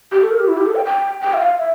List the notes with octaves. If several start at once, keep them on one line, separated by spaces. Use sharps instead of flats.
G4
A4
A#4
G4
E4
G4
A4
G5
G5
G5
E5
F5
E5